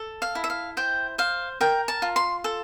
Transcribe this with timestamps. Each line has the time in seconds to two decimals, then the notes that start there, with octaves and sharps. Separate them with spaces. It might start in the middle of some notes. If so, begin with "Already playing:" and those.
Already playing: A4
0.22 F5
0.35 E4
0.44 E5
0.50 F5
0.77 C5 G5
1.18 C5 F5
1.61 A#4 G5
1.88 A5
2.02 F4
2.16 C6
2.44 A4